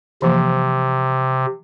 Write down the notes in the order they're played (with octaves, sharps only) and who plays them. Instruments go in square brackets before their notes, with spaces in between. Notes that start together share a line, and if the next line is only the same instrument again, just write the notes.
[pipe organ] C3 [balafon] E3 F3 A#3